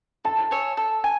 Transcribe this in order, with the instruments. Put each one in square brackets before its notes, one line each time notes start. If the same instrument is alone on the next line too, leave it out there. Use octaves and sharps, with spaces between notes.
[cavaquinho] A4 [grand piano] A5
[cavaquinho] C#5 E5 G#5
A4
G#5